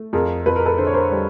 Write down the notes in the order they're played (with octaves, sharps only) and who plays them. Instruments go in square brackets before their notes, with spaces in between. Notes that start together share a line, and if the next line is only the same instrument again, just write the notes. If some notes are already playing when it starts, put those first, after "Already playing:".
Already playing: [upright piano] A3
F2 G#4 A#4
F2 B4
A#4
A4 B4
D3 C5
C#5
A#4 C5
G3